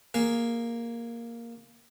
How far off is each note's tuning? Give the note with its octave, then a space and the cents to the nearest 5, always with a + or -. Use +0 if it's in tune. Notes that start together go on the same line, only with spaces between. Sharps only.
A#3 +0 G#4 +0